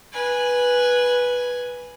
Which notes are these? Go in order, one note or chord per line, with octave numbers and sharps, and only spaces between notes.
B4 G#5